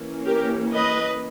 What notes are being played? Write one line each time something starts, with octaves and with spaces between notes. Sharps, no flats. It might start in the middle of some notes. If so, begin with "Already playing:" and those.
Already playing: E3 A#3 C#4
G4 A#4
B4 D#5